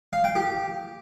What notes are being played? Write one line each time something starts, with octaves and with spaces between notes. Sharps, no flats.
F5
G5
G4